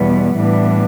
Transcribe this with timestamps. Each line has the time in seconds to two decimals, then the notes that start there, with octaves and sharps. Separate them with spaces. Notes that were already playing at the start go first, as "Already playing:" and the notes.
Already playing: E2 B2 G3 B3
0.35 A2 E3 G3 B3 D4